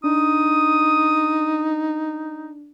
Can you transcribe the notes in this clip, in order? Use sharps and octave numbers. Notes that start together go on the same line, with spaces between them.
D4 D#4 D#6